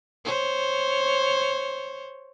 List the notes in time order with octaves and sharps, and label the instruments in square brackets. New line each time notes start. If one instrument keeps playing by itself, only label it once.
[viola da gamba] C5 C#5